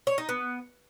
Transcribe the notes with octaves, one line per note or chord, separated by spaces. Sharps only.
C#5
D#4
B3